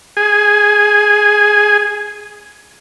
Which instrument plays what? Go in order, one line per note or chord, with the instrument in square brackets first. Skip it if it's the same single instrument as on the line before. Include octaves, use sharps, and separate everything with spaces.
[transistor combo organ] G#4 G#5